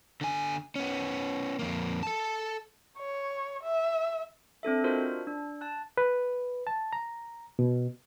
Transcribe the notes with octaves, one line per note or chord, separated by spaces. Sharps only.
D3 G#5
B3 C#4
F2 A#3
A4 A5
C#5
E5
C4 D4 A4 E5
D4 F4 F#4 A#4 C5 D#5
D4
A5 F#6
B4
A5
A#5
B2